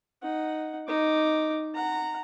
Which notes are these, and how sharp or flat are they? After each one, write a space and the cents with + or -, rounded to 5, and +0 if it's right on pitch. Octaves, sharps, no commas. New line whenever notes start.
D#4 +0 F#5 +0
D#4 +0 D6 +0
F#5 +0 A#5 -15